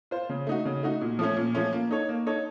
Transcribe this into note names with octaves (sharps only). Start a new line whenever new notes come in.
F4 C5
C#3
A3 D#4 F#4
C#3
A3 D#4 F#4
A#2
F3 A3 C#4
A#2
F3 A3 C#4
A#3
D#4 A4 C#5
A#3
D#4 A4 C#5